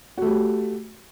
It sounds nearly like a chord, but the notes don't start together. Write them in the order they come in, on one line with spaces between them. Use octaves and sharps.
F#4 A3 G4